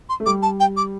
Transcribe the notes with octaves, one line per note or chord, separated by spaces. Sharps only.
C6
A3
G3 D6
A5
G5
D6